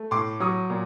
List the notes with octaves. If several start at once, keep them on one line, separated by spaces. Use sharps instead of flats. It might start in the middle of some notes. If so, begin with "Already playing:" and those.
Already playing: A3
A2 C6 D6
F#3 C#6 D#6
A#2